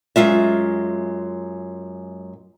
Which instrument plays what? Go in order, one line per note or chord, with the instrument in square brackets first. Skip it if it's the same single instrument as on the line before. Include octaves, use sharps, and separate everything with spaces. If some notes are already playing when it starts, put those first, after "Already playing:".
[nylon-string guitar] F#2 G#3 F4 E5